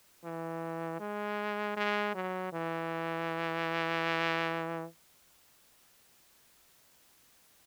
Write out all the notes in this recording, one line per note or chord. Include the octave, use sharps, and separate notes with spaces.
E3
G#3
G#3
F#3
E3